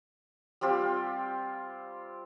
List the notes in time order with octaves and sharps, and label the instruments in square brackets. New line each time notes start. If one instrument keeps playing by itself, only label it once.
[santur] G3 C4 F4 G4